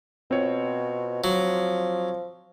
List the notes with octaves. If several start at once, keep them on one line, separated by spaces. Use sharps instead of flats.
B2 C4 F4 C#5
F3 F#3